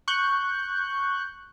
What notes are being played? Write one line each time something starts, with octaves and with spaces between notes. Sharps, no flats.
C#6 F#6 G6